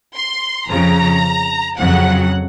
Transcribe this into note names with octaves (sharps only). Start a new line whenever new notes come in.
C6
F2 C#3 F3 A#5
F2 C#3 F#3 F#5